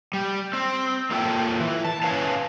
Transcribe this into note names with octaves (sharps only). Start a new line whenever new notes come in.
G3
C4
A#3 F4 A4 F5 G5 A5
E3
A5
C#4 B4 C#5 F5 A5